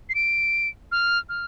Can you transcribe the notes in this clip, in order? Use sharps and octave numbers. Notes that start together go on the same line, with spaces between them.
C7
D7
F6
F6